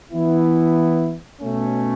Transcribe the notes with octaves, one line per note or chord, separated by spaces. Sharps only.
E3 B3 E4
B2 A3 C#4